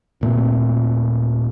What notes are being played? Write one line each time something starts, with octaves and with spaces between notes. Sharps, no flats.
D#1 A#2 A3 C4